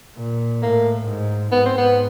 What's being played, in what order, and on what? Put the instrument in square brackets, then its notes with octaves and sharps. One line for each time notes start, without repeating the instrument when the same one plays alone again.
[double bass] A#2
[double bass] A2 [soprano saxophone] A#3
[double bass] G#2
[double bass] G#2 [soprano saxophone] B3
[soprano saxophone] C4
B3